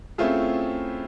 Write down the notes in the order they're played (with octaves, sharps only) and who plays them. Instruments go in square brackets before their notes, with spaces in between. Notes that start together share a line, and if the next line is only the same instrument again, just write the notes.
[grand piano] A3 C4 C#4 E4 F4 G#4